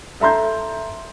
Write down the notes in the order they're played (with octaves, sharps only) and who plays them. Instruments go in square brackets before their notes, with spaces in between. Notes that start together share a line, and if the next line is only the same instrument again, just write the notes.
[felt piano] A4 E5 A#5 C6 G6